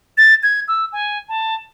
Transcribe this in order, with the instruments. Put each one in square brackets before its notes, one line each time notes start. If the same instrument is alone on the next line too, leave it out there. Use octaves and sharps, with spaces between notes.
[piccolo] A6
G#6
E6
G#5
A5